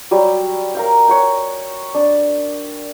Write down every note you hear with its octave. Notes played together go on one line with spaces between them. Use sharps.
F#3 G3 G4
A#4 F5 G5
C#5 F#5 G5
D4